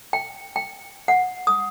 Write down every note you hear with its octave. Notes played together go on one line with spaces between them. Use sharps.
G5
G5
F#5
D#6